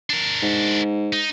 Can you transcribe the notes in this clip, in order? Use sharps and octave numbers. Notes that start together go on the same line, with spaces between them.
D4 A#4
G#2
D#4